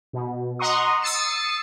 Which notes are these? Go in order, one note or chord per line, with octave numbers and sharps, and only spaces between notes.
B2
D#5 F#5 A#5 C6 C#6 D#6
D#6 E6 A6 C7 C#7 E7